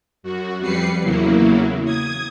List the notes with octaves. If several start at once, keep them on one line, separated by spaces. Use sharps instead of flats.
F#2 F#4
F2 G3 B4 C7 C#7
E2 C#3 F#3 A#3 E4
D#6 G#6